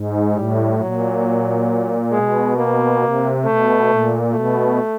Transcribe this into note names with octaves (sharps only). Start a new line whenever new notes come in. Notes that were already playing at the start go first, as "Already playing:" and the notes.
Already playing: G#2
A2 G3
A#2 F#3
B2 G#3
A#3
C3
B2 A3
A#2
B2 A3